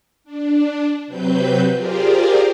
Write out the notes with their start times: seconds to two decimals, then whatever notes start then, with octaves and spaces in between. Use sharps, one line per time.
0.24 D4
1.07 C3 F#3 C4 B4 G6
1.73 F4 G4 G#4 A#4 C5 D5